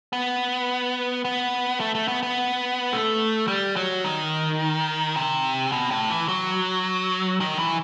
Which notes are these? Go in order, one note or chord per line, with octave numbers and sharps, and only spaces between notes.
B3
B3
A3
A3
B3
B3
A3
G3
F#3
D#3
C3
B2
A2
E3
F#3
D#3
E3